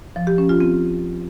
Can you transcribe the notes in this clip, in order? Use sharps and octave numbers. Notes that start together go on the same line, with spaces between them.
F3
G4
C#4
F4
C4